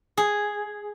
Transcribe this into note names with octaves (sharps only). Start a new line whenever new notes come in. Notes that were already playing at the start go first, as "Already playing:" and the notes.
G#4